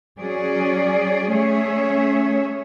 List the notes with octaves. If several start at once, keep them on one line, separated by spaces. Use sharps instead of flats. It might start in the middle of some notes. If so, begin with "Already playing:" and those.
F#3 C#4 G#4 D5
A3 C#4 G#4 C#5 E5